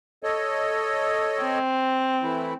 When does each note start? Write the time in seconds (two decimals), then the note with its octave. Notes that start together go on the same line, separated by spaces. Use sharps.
0.23 A4 C#5 D#5
1.40 C4
2.23 E3 A3 E4